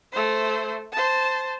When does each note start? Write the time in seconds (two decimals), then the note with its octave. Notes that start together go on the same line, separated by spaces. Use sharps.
0.13 A3 C5
0.93 C5 A5